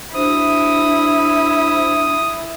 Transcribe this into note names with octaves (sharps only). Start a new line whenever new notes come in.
D4 E4 F#4 C5 D#6